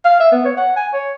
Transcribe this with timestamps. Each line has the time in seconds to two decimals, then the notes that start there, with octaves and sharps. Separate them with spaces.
0.05 F5
0.20 E5
0.32 B3
0.45 C#5
0.57 F#5
0.76 G#5
0.93 C#5